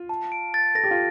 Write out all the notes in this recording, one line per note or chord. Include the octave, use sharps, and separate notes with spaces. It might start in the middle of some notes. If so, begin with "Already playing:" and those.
Already playing: F4
A5
D7
A6
A4 A#6
G4
F4